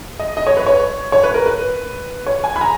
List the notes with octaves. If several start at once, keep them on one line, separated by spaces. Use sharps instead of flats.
D#5
D#5
C#5
B4
C#5
C#5
B4
A#4
B4
C#5
G#5
B5
A#5